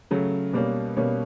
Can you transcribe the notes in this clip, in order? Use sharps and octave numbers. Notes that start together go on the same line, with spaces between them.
C#3 F#3 A3
B2 G3 A#3 C#4
B2 G3 A#3 C#4